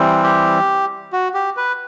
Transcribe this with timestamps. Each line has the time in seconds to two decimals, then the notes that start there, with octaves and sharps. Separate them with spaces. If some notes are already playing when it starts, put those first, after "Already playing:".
Already playing: E3 G3 C4
0.23 G4
1.13 F#4
1.34 G4
1.57 B4